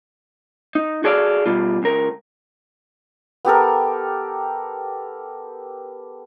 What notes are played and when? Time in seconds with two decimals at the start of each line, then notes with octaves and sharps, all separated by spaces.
0.75 D#4
1.04 F#4 G#4 A4 D5 D#5 F5
1.46 B2 G3 F4
1.83 C#2 A#4
3.45 B3 G4 A4 A#4